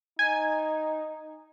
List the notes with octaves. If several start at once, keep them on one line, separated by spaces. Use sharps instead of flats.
D#4 G#5